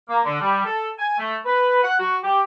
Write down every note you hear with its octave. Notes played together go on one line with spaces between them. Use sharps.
A#3
D3
G3
A4
G#5
A3
B4
F#5
F#4
G4